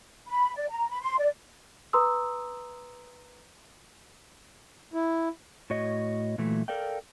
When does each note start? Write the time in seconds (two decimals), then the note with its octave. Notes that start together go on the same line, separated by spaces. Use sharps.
0.27 B5
0.55 D5
0.69 A#5
0.89 B5
1.01 C6
1.18 D5
1.93 B4 A#5 C6 D#6 E6
4.94 E4
5.70 A2 F#4 C#5 D#5
6.38 A#2 E3 F#3 A3
6.68 A4 A#4 D5 F5 G5